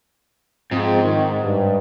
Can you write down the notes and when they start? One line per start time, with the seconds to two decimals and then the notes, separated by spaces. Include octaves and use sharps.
0.71 G#2 F3 G#3 C4
1.03 D#3
1.43 G2